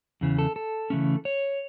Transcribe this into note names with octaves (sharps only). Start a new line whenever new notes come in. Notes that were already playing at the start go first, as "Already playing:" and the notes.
E2 C#3 E3
A4
A4
C#3 E3 A3 C#4
C#5